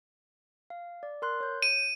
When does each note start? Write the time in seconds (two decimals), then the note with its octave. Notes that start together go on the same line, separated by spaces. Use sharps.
0.70 F5
1.03 D5
1.22 A#4 C6 F#6
1.40 C#5 G6
1.62 D#7